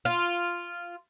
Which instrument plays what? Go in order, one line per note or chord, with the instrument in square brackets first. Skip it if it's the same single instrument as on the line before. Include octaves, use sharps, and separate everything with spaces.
[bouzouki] F4